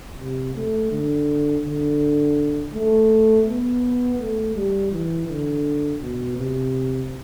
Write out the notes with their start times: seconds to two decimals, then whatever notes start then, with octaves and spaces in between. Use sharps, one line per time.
0.18 C3
0.55 A3
0.91 D3
1.64 D3
2.73 A3
3.46 B3
4.18 A3
4.55 G3
4.91 E3
5.28 D3
6.01 B2
6.37 C3